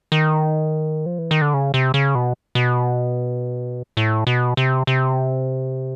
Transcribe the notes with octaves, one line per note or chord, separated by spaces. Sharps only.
D#3
F3
E3
D#3
D3
C#3
C3
C#3
B2
B2
A2
B2
C3
C3